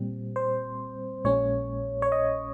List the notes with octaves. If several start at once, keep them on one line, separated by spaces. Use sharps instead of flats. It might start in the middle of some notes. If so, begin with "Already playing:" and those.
Already playing: A#2 G3 C4
C5
A#1 A#2 G#3 C#4 C#5
C#5
D#5